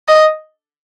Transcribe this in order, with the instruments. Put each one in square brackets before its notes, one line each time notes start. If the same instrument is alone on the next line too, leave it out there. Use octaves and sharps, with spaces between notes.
[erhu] D#5